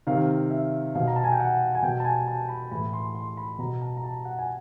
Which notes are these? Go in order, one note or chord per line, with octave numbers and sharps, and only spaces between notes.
C3 D#3 F5
E5
B2 F5
A#5
A5
G#5
G5
F#5
G#5
B2 G5
A5
G#5
A5
B5
A2 E3 B5
C6
C6
B5
B2 A#5
A5
A#5
A5
F#5
G#5